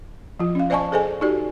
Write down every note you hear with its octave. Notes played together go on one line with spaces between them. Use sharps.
F3 F4
C#4 F5
C5 D5 D#5 G#5 A5 C#6
G#4 A4 C5 D#5 G#5
D#4 F#4 G4 D5